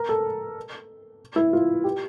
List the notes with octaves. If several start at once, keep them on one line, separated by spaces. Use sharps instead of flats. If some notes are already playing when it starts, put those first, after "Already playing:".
Already playing: A#4
A4
E4
F4
G4